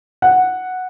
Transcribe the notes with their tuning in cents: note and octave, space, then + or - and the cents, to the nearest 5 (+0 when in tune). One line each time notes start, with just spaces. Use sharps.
F#5 -5